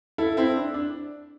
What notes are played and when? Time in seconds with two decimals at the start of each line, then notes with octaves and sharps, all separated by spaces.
0.18 E4 A4
0.37 C4 E4
0.56 D4
0.74 D4